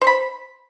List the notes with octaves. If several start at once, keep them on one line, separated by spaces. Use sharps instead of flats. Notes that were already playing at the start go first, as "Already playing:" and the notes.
C5 B5 C#6